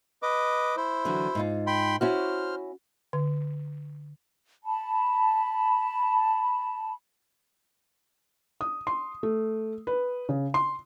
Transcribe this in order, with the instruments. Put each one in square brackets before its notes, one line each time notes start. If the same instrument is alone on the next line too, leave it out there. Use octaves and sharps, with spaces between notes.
[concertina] B4 D#5 D6
E4 C5
[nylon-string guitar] D3 E3 F#3
G#2 D#4 F4
[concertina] G5 B5 C6
[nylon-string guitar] C#4 E4 F#4 [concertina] C5 F6
[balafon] D3
[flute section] A5 B5
[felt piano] D#6
C6
A3
B4
C#3
C6